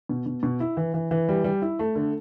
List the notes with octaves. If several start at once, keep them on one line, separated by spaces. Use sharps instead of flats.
B2
B2
B2
E4
E3
E3
E3
G3
G3
E4
A3
D3